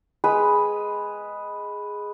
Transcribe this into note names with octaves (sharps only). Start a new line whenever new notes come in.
G#3 G#4 B4 B5